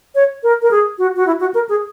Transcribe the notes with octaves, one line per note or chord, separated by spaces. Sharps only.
C#5
A#4
A#4
G#4
F#4
F#4
E4
F#4
A#4
G#4